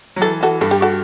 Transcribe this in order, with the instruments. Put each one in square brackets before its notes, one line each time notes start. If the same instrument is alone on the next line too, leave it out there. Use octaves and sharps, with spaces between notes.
[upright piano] F#3
[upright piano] E3 [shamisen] A4
[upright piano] E3 [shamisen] F#4 A4
[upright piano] G2 G3 [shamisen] A4
[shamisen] G4
F#4 A4